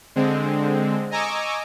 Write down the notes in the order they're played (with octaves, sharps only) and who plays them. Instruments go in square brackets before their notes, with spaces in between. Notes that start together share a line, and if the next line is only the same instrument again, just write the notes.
[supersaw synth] D3 G#3 C4
D#5 G#5 A#5 C#6 D6 E6